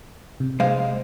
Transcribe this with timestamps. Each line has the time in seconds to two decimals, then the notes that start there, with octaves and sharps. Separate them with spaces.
0.40 C3
0.60 G#3 C5 F5